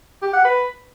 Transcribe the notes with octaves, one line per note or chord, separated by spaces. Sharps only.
G4
F#5
B4